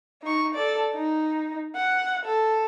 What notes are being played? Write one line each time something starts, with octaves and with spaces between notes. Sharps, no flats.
D#4 C#6
A4 D5
D#4
F#5
A4